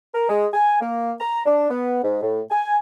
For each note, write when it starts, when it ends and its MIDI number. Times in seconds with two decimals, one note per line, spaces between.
0.14 0.26 70
0.29 0.48 56
0.54 0.79 80
0.81 1.12 58
1.20 1.41 82
1.46 1.67 62
1.70 2.01 59
2.03 2.21 44
2.23 2.41 45
2.51 2.78 80